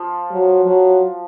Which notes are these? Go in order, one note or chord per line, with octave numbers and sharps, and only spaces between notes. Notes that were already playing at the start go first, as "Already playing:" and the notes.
Already playing: F3
F#3
F#3